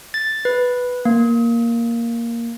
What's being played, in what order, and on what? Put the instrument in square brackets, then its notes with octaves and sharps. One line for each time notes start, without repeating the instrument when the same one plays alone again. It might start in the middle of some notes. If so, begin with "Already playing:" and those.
[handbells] A6
B4
A#3